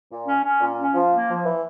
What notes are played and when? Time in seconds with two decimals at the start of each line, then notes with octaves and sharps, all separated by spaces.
0.10 A#2
0.27 C#4
0.44 C#4
0.61 A#2
0.77 C#4
0.94 F3
1.12 A#3
1.28 F3
1.45 E3